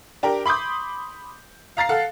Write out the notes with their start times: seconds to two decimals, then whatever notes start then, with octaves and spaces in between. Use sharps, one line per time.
0.23 D4 G4 A#4
0.46 B5 C6 D6 D#6 G6
1.77 F5 A#5 A6 C7
1.89 A4 F5 F#5